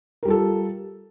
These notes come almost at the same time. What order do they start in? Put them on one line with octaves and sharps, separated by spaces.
A#4 G3 F4 A4